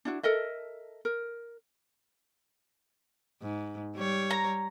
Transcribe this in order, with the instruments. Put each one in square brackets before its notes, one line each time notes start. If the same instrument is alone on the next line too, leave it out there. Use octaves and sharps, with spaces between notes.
[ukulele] D4 E4 F#4
A4 A#4 D#5 E5
A#4
[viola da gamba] G#2
G3 C#5
[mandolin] A#5